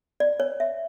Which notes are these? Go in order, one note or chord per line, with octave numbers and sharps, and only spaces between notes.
D5
C#5
E5